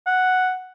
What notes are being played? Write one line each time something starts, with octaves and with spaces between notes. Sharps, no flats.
F#5